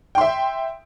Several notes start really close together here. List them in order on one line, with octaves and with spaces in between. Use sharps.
G5 C6 E5